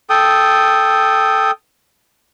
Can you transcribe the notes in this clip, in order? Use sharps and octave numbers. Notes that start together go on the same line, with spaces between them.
A4 G5 D#6